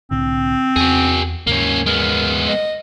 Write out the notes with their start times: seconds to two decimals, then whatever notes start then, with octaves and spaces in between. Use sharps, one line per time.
0.11 C2 A2 D3 C4
0.76 E2 F#4 G#4
1.47 D#2 G#2 C#3 A#3 C#4
1.86 G#3 B3 A#4
2.49 D#5